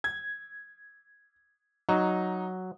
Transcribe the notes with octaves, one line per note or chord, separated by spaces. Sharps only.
G#6
F#3 D#4